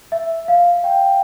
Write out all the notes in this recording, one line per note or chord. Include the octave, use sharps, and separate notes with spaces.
E5
F5
G5